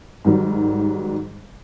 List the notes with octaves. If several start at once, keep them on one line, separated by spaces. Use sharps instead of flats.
G#2 D#3 F#3 G3